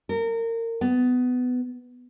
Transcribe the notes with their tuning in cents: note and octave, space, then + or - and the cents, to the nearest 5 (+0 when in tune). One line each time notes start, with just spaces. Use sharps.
A#4 -30
B3 +15